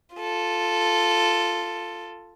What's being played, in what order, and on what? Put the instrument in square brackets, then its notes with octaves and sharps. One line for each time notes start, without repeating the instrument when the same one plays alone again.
[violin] F4 A4